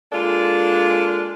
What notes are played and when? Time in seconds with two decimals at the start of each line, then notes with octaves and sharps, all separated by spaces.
0.12 G#3 A#3 D4 F4 A4